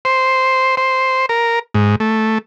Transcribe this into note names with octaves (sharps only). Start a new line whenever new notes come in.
C5
C5
A#4
G#2
A3